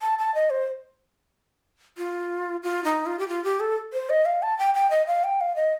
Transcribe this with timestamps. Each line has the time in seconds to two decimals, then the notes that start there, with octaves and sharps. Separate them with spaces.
0.02 A5
0.19 A5
0.35 D#5
0.50 C5
1.98 F4
2.63 F4
2.84 D#4
3.06 F4
3.19 G4
3.28 F4
3.44 G4
3.60 A4
3.93 C5
4.10 D#5
4.25 F5
4.42 A5
4.59 G5
4.75 G5
4.90 D#5
5.07 F5
5.24 G5
5.41 F5
5.56 D#5